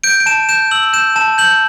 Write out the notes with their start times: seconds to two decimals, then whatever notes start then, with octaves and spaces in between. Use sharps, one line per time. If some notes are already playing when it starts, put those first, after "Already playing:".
0.04 G6 D7
0.20 D7
0.26 A5 E7
0.49 G6 E7
0.71 E6 F#7
0.93 G6 E7
1.16 A5 E7
1.38 G6 F#7